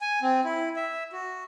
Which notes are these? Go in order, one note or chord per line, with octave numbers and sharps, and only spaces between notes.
G#5
C4
E4
E5
F#4